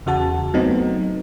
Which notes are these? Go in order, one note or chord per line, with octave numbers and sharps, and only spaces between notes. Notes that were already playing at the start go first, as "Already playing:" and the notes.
E2 C#3 F#4 A5
F#3 A3 B3 C4 D#4